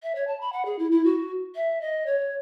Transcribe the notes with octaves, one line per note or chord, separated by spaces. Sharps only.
E5
C#5
A5
B5
F#5
G#4
E4
E4
F#4
E5
D#5
C#5